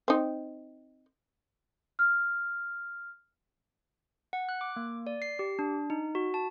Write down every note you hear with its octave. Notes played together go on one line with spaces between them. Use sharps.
C4 D#4
F6
F#5
F#6
D6
A#3
D5
C7
G4
D4
D#4
F#4
A5